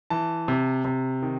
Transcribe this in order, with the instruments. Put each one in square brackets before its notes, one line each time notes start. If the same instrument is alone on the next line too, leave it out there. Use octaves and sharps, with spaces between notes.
[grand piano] E3 A5
C3
C3
D#3